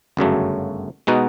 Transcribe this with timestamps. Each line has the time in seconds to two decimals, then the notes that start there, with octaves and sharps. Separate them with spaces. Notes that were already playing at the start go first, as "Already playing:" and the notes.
0.17 G1 F#2 C#3 F#3 A3
1.07 B2 G#3 B3 D#4 F#4